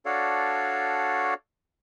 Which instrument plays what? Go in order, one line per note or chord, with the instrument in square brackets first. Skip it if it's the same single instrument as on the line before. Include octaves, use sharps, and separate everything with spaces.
[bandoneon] D4 F#4 A4 C#5 D5 F5